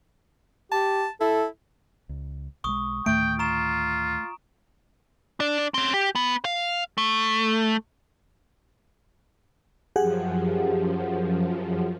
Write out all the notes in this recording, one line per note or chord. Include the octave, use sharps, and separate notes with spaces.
G4 A5
E4 A4
C#2
B1 G3 G#3 C#6 D#6
D2 A2 D#3 A3 G5 D7
F4 A#5 C#6 E7
D4 D5
C4 C#4
G4
B3
F5
A3
F#2 F3 G4 G#4 F#5